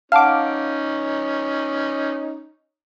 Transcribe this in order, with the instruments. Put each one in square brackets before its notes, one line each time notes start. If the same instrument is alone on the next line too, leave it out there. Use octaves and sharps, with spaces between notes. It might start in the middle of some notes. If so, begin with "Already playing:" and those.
[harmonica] C#4 D#4 [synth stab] F5 D6 [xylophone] F#5 A5 F6